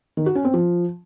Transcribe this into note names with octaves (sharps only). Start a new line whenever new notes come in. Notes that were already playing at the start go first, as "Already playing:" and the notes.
D#3
F#4
C#4
C4
F3